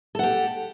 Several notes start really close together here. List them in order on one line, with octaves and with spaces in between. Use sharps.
A4 F#5 G4